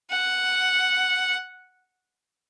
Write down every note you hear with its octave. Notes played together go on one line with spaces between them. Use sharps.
F#5